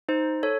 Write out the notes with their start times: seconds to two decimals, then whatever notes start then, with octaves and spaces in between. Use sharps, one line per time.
0.09 D#4 C5
0.43 A4 C#5